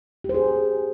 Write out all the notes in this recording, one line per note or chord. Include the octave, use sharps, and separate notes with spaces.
G4 G#4 C5